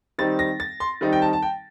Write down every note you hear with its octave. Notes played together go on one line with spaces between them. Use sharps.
D#3 G3 C4 D#4 A6
A#6
A6
C6
D#3 G3 C4 D#4
G5
A5
A5
G5